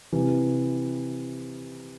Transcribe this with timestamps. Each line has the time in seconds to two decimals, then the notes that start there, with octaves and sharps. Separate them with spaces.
0.12 C3 E3